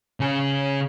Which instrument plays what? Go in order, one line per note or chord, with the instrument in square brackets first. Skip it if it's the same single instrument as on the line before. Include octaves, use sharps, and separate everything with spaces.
[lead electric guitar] C#3 G#4